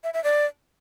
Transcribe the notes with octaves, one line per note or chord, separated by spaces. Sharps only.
E5
E5
D5